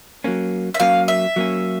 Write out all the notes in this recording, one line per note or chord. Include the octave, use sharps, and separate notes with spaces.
F#3 A#3 C#4
E5
F#3 A#3 C#4 F5
E5
F#3 A#3 C#4